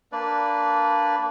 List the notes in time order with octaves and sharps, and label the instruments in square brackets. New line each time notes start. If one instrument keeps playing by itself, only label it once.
[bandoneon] A#3 D4 B4 D5